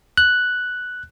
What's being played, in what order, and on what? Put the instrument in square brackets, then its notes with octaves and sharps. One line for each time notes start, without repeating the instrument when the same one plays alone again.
[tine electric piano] F#6